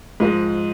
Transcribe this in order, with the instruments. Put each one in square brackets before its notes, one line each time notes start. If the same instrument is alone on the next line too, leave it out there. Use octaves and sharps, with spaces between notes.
[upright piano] G#2 F3 G#3